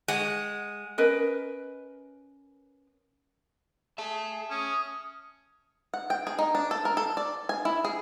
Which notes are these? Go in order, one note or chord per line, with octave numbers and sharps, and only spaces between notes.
G#3 F#5
C#4 A#4 B4 D#5
G#4 E5 A5
C#4 D#6
F#5
G5
G#4
D#4
D4
A4
A#4
A4
D5
G#5
E4
G#4